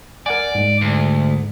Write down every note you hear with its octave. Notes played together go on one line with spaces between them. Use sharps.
A#4 D5 F#5 G#5
G#2 G#3
D2